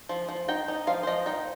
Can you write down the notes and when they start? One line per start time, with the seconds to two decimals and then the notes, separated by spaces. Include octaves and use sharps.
0.09 F3
0.29 F3
0.48 D#4 G5
0.68 D#4
0.87 F3 F5
1.03 C5
1.07 F3 D#5
1.26 D#4 G5